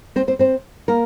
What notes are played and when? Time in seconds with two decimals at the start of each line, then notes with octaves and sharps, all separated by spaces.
0.16 C4 C5
0.28 C4 C5
0.39 C4 C5
0.88 A#3 A#4